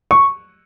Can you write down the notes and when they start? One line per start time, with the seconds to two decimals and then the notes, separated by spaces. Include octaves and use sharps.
0.11 C#6